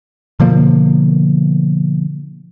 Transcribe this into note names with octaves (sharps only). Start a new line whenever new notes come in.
B2 D3 F3 A#3